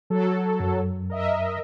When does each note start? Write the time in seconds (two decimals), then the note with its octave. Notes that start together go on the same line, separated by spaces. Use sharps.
0.10 F#3 A4
0.60 F#2
1.10 A#4 D#5 E5